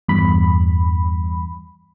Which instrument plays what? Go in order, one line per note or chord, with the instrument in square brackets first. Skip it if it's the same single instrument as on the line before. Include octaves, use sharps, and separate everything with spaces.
[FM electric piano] E2 G2 B5